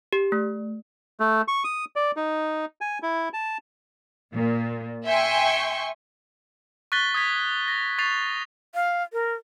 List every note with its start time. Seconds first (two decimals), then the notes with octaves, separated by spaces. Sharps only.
0.13 G4
0.32 A3
1.20 A3
1.48 C#6
1.64 D#6
1.96 D5
2.16 D#4
2.81 G#5
3.03 E4
3.33 A5
4.33 A#2
5.06 E5 G5 G#5 C6 C#6
6.92 C#6 F#6 A6 B6 G7
7.14 D#6 G#6 B6
7.68 A#6
7.98 C#6 A6 C7 F7
8.75 F5
9.13 A#4